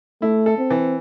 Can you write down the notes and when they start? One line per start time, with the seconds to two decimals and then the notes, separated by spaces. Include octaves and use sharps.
0.22 A3 E4
0.46 A4
0.58 C4
0.71 E3